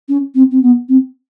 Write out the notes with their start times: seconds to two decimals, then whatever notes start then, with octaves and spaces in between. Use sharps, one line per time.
0.09 C#4
0.35 C4
0.51 C4
0.63 B3
0.89 C4